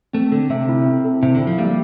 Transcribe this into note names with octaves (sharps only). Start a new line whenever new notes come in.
A3 C4
D3 A4
C3 E5
E4
C4
A4
C3 E5
D3
E4
F3
G3 A#3